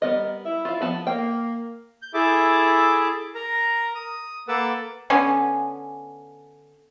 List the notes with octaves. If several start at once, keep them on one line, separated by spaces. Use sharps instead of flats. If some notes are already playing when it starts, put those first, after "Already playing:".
G3 B3 A#4 D#5
E4 E5
F4 F5
F3 B3 A5
A#3 G5
G6
E4 G#4 A4 E5 D6
A#4 A#5
D#6
A#3 A4 B4 F#5 D6 E6
D3 B3 C#4 G#5